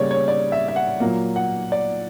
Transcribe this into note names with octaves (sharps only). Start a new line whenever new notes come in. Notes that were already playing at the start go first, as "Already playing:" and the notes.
Already playing: C#3 G3 A#3 C#5 D5
C#5
D5
E5
E5
F#5
A#2 F#3 A#3
F#5
D5